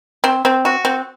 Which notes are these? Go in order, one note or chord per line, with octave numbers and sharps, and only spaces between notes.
C4
C4
F#4
C4